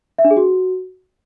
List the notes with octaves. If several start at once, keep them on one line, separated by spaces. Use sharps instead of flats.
E5
D4
G#4
F#4